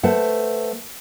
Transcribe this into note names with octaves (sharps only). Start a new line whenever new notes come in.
A3 B4 C5 F#5